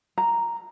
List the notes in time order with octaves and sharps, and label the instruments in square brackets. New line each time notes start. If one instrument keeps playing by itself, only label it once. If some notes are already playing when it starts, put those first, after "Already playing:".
[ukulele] A#5